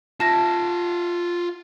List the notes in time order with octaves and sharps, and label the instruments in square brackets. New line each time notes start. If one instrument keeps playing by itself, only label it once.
[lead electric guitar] F4 E5 [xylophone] A5 A#6